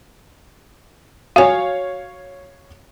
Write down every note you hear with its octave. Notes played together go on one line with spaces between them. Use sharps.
F#4 C#5 F5 G#5